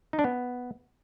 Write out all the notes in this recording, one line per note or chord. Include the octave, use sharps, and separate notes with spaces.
D#4
D4
B3